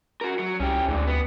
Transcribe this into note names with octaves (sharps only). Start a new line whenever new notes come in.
F#4 A#4
F#3
C2 C#4 G4
D2 G#2 D3
B3